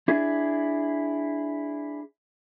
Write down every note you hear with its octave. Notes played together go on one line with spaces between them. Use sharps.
D4 E4 G#4